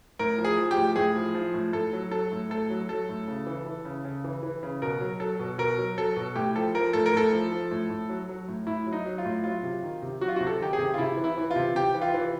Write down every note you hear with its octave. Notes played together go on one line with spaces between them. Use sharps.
A2 A#4
F3
G#4
F3
G4
A2
A2 G#4
F3
F3
A2
A2 A4
F#3
F#3 A4
A2
A2 A4
F#3
F#3 A4
A2
C#3
E3
E3
C#3
C#3
E3
E3
C#3
B2 A#4
F#3
F#3 A4
B2
B2 A#4
F#3
F#3 A4
B2
A2 G4
F3 A4
F3 A#4
A2 A4
A#4
A2 A4
F3
F3
A2
A2
F#3
F#3
A2
A2 E4
F#3
D#4
F#3
F4
A2
F#3 F4
C3
D#3
C3
F#3 F#4
F4
F#4
C3
A4
D#3 G4
G#4
C3
F4
C3 E4
E3
E4
E3
F4
C3
C3 G4
E3
F4
E3